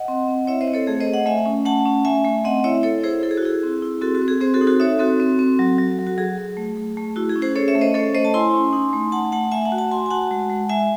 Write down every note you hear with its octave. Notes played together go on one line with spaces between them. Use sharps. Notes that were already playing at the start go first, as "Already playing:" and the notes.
Already playing: D#5 F#5
C4
C4
E4 C#5 E5
C5 D#5
C4
A4 C#5
A3 G#4
C5 D#5
A3
D#5 F#5
A3 E5 G#5
C#4
A3 F#5 A5
C#4
A3 E5 G#5
A3
C4 D#5 F#5
E4 C#5 E5
E4 A4 C#5
E4 G#4 C5
E4 A4
G#4
F#4
E4 G#4
C4
E4
C4 F#4 A4
F#4
C4
G#4
C4 G#4 C5
F#4 A4
D#4
F#4 A4
D#4 C#5 E5
C4 F#4 A4
C4
C4
F#3
F#3
F#3
F#4
F#3 G#4
F#3
A3
A3
A3
E4 F#4
G#4
C#4
G#4 C5
C#4 A4 C#5
C#5 E5
A3
C5 D#5
C#4 A4 C#5
A3 C5 D#5
A5
E4 G#5 C6
C#4
D#4
A3
A3 F#5 A5
A3 F#5 A5
A3 E5 G#5
F#5 A5
F#4
F#5 A5
F#4 G#5 C6
G#5
F#4 F#5 A5
G#3
G#3
G#3 E5 G#5